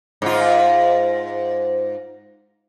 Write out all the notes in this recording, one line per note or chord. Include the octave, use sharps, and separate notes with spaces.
G#2 F4